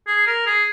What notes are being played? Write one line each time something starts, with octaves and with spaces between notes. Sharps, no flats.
G#4
A#4
G#4